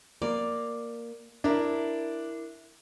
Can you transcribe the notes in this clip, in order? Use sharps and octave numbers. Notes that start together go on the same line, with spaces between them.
A#3 D5
D4 E4 A#4